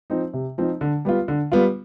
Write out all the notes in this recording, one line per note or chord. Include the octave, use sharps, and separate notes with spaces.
F3 C4 D#4
C3
F3 C4 D#4
D3
G3 B3 F4
D3
G3 B3 F4